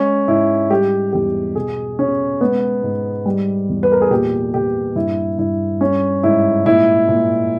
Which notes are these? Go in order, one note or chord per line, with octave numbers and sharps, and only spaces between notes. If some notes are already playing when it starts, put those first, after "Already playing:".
Already playing: G#3 C#4
G#2 E4
G3 G4
E2 G4
B2 G#4
B2 C#4
G#3 B3
G#2
G3
E2
B4
A#4
G#4
A#2 G4
A#2 G4
G2 E4
G2 E4
G3 C#4
G#2 E4
A#2 E4
A#2